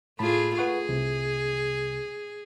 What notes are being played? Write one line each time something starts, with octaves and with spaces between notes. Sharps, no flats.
A2 A3 F4 G#4 A5 B5
G#4 B4 F#5 C#6
C2 C3